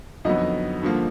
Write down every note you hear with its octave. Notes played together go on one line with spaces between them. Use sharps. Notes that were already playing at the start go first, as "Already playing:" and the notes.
F2 D3 F#3 B3 D#4 D#5
G2 D3 F3 A#3